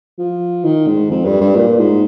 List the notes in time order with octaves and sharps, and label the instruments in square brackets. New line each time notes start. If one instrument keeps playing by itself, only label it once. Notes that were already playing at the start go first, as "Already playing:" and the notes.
[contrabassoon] F3
D#3
G#2
F2
G2
G2
A#2
G#2